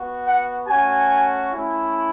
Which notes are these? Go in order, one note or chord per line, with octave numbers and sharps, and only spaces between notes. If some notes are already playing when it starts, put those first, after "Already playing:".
Already playing: B3 F#4
F#5
A3 C#4 F#4 G#5
A3 C#4 E4